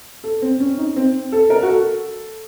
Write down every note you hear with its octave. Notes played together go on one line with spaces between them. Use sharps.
A4
C4
C#4
D#4
C4
A4
A#4
F#4
A4